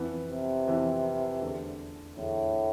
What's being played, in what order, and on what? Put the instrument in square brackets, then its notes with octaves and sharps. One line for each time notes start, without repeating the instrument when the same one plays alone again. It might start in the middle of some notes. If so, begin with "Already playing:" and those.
Already playing: [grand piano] F2 E3 B3
[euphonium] C3
[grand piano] F2 E3 B3
E2 D3 A3
[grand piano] E2 D3 A3 [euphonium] A2